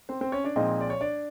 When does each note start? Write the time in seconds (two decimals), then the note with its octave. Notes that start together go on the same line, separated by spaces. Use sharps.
0.09 C4 C5
0.21 C4 C5
0.32 C#4 C#5
0.44 D4 D5
0.56 A#2 F3 G#3 C4 D#4 D#5
0.81 D5
0.90 C#5
1.01 D4 D5